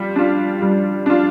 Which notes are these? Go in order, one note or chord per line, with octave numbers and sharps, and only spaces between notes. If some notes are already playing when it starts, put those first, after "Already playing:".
Already playing: G3 F4
D4 F4
G3
D4 F4